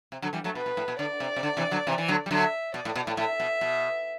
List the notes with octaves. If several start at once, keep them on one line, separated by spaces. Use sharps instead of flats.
C3
D3 F#3
E3 G3
F#3 A3
B2 B4
B2
A2
B2
D3 D5
C3
C3
D3
C3 E3
D3 F#3
C3 E3
E3
D3 F#3
G3
D3 F#3 E5
B2 D5
A2
B2
A2
A2 E5
B2
B2